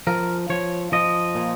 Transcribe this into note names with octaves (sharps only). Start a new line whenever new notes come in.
F3 A#4
F3 C#5
F3 D#5
A#2